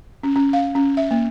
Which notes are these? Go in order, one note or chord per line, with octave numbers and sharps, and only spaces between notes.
C#4
C#4
F5
C#4
E5
A#3